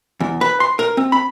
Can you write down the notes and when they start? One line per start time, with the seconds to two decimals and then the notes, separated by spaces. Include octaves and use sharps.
0.20 E2
0.41 B4
0.60 C6
0.79 A#4
0.97 C4
1.12 B5